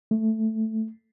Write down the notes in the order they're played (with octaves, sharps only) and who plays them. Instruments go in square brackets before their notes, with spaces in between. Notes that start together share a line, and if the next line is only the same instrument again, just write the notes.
[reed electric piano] A3